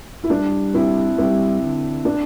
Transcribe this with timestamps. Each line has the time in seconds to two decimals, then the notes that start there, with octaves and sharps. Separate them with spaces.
0.24 E4
0.30 G3 D4
0.74 C4 E4
1.18 G3 C4 E4
1.61 D3
2.05 D4